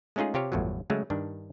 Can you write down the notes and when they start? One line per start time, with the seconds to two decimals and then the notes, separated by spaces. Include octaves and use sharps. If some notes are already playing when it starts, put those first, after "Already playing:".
0.16 G#3 A3 C#4 D#4 F4 G#4
0.34 C3 F4 G4 C#5 F5
0.52 G1 E2 A2 F3 F#3
0.90 C#3 F#3 G#3 A3
1.10 G2 D#3 D4